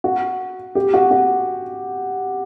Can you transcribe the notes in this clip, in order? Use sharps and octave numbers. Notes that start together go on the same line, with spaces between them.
F#4
G4
F#4
F#4